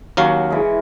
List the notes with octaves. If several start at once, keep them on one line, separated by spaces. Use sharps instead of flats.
D#2 F#3 C#4 F#4 F5
E3 G#3